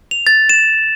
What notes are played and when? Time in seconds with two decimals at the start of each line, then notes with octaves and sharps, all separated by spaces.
0.11 F7
0.27 A6
0.49 E7